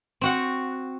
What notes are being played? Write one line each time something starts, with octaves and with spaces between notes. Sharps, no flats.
C4 F#4 F#5